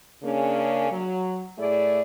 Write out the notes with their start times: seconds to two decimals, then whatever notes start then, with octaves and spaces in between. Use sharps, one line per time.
0.23 C#3 A#3 C#4 D4 G#4
0.91 F#3
1.58 A2 A3 E4 G#4 D5